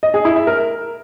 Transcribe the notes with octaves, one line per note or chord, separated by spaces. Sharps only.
D#5
G#4
E4
E5
A#4